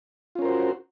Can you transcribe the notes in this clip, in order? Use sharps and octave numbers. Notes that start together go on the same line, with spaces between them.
C#4 F4 F#4 A#4 C5